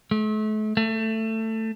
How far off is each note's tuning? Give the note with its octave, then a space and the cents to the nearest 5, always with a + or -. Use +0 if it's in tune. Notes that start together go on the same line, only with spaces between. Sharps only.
A3 -40
A3 +15